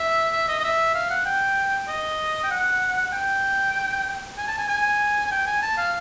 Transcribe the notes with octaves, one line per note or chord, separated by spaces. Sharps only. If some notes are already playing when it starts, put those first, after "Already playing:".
Already playing: E5
E5
D#5
D#5
E5
F5
F#5
G5
D#5
G5
F#5
G5
G#5
A5
G#5
G#5
G#5
G5
G#5
A5
F5